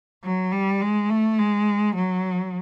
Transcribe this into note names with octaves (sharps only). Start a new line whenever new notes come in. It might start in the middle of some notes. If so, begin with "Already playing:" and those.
F#3
G3
G#3
A3
G#3
F#3